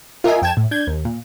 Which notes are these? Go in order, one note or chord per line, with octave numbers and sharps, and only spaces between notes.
F4 A#4 D#5 E5 G#5
F2 G5 A5 G#6 E7
A2
D4 G6 G#6
D#2
A#2